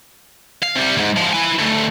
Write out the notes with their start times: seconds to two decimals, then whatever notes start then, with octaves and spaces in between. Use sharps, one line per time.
0.63 F5
0.76 C3 G3
0.97 D2 G#2
1.17 F3 G#3
1.33 E4 G#5
1.59 D2 A2